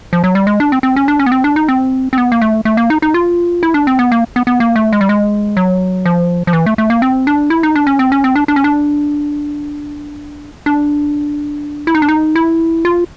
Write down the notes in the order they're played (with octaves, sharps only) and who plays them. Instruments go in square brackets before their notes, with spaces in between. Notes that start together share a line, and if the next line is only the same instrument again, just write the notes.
[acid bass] F3
F#3
G3
G#3
D4
C4
C4
C#4
D4
C#4
B3
C4
D4
D#4
C4
C4
B3
A#3
A3
A3
A#3
D#4
D#4
F4
E4
D4
C4
B3
A#3
B3
B3
A#3
A3
G#3
G3
G#3
F#3
F3
F3
E3
A3
A3
A#3
C4
D4
E4
D#4
D4
C#4
C4
C#4
C4
D4
D4
C#4
D4
D4
E4
D#4
D4
D#4
E4
F4